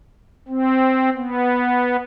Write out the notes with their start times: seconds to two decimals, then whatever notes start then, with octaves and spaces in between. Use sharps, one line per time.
0.48 C4
1.16 B3